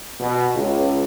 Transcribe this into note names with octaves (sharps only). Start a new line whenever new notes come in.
B2
C#2